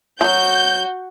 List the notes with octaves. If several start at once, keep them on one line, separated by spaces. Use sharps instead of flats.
F3 F#3 F#4 G6